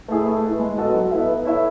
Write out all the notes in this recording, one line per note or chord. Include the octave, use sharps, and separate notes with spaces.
A3 E4 G#4
A3
E4 B4
G#3
B3 F#4 A4 D#5
F#3
B3 E4 A4 E5
B3
E4 A4 C#5 E5